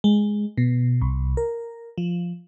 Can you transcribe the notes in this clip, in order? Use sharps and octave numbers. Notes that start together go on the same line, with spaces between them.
G#3
B2
C2
A#4
F3